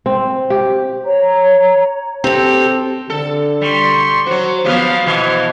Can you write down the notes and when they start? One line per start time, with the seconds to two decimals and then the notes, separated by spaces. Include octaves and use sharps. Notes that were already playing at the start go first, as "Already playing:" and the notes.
0.06 C4
0.50 G4
1.05 C#5 A#5
2.24 C4 G4 A4
3.10 D3 A4
3.61 G3 C6 C#6
4.27 F#3 F#4 C5
4.64 F3 F#3 B3 C5 F5
5.06 B2 E3 F#4 F5